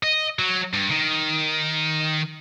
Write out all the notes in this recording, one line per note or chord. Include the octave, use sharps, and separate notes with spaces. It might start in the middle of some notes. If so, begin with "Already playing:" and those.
D#5
F#3
G2
D#3